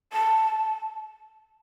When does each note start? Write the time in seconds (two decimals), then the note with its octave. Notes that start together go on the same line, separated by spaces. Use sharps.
0.13 A5